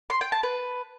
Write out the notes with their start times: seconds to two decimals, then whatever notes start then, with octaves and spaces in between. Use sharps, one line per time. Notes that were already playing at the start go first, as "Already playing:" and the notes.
0.10 C6
0.21 G5
0.32 A5
0.43 B4